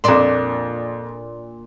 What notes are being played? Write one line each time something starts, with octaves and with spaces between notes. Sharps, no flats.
F2 A#2 D4 C6